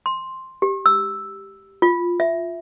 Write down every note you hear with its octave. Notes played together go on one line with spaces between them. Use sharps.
C6
G4
E6
F4
E5